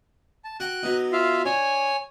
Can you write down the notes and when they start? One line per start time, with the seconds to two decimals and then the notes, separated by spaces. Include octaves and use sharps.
0.44 A5
0.60 F#4 F#5 G5 F#6
0.83 F#3 B3 D#4
1.12 F4 E5 F5
1.46 D4 C#5 G#5